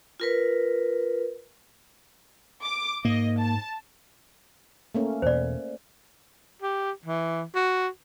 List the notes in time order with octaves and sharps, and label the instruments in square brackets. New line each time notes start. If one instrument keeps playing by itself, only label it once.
[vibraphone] F4 A#4 B4
[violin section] D6
[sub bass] G#2 [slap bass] A#3 [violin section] D#5
[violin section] A5
[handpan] A3 A#3 C#4
[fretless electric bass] E2 B2 [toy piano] C5 D5
[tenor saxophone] G4
E3
F#4